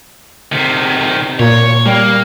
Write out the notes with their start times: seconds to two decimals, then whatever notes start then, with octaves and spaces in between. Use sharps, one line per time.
0.52 C3 D#3
1.40 A#2 C#5
1.86 G3 A#3